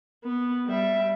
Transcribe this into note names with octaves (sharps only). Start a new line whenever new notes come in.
B3
G3 E5